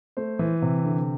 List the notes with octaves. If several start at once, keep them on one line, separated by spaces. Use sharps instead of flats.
A3 C5
E3
C3
D3